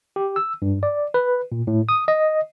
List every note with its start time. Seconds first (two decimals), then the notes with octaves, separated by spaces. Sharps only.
0.16 G4
0.36 E6
0.62 G2
0.83 D5
1.14 B4
1.52 A#2
1.67 A2
1.89 D#6
2.08 D#5